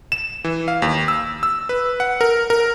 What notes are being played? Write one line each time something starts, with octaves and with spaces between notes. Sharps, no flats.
E7
E3
F5
D#2
E6
E6
B4
F#5
A#4
A#4